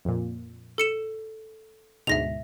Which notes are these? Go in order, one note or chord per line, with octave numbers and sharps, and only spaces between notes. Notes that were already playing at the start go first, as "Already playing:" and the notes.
F2 A#2
A4 C#7 E7
D2 G#2 B2 E5 A#6 F7